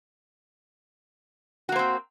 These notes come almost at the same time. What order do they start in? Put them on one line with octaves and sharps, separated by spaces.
F#4 A#3 C5 C4